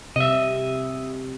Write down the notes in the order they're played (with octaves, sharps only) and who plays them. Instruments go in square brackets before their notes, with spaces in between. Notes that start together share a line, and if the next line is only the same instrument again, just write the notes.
[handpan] C3 [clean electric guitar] D#5 E5